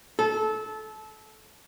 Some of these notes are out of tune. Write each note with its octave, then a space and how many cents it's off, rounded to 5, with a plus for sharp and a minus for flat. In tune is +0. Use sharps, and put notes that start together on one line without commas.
A4 -25